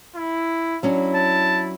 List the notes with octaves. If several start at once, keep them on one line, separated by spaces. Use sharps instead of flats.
E4
F#3 C#4 D4 E4
A5